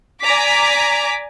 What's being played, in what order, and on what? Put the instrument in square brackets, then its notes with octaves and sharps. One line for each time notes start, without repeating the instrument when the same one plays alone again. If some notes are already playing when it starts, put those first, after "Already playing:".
[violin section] D5 G#5 A#5 D6 B6